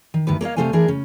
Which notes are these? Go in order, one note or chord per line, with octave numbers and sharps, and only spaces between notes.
D#3
D2 G2 D#3 B4
A#3 C#5 D#5 F5
C3 F3 A3 C5 F5 G#5
E3 D4 G#4 A#4
C#3 C#4